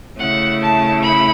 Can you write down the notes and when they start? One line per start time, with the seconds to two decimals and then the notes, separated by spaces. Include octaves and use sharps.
0.18 C#3 A3 C#4 E4 F#5
0.60 A5
1.01 B5